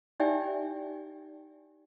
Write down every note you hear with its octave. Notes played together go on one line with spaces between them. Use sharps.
D#4 G4 D5 E5 G5 G#5